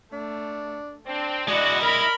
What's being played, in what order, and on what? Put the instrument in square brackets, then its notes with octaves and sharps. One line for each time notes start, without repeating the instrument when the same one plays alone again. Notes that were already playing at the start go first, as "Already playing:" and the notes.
[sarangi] A3 [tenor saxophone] D4
[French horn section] C4 [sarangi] D4
[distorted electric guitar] G#3 E4 [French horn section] F#4 [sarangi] D5 [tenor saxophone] D#5
[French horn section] A#4 [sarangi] B5